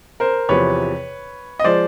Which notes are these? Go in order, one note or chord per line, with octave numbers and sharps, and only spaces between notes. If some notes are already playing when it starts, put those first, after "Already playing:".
A#4 C5
E2 C3 F3 B4 C#5
D#5
F3 G#3 C5 D5